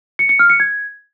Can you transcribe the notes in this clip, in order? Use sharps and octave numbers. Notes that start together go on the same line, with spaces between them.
C#7
C#7
F6
C#7
G#6